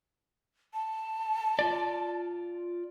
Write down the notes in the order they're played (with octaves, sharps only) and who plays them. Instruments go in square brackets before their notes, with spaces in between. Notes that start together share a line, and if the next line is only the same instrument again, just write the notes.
[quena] A5
[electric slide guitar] F4 D5